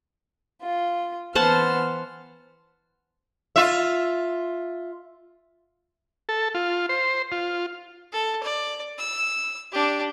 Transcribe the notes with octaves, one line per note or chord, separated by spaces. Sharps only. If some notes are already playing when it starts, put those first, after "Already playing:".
F4
E3 B3 C5 F#5 A5 F6
F4 E5
A4
F4
C5
F4
A4
D5
E6
D4 G4